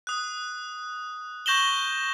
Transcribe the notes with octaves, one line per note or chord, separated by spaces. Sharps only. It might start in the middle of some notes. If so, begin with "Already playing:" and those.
D#6 F#6
C#6 G6 A#6 E7 F#7 G7